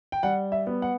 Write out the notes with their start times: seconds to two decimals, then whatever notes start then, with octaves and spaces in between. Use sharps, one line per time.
0.12 G5
0.23 G3 F#5
0.52 E5
0.67 B3
0.82 F#5